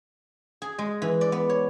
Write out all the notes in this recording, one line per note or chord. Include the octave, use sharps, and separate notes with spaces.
G#4
G#3
E3
D5
B3
C#5